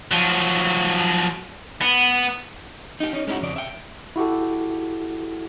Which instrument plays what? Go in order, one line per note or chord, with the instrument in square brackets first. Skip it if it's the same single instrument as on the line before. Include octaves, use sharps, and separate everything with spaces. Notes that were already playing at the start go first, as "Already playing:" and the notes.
[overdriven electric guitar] F3 F#3
B3
[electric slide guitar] D#4 G4
C#4 D#4
G#3 C#4 D#4 E4 F#4
F2 C#3 D5
E5 G5
[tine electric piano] E4 F#4 G4 A4